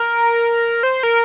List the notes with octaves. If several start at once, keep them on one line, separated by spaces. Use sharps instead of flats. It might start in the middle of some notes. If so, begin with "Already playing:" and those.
Already playing: A#4
C5
A#4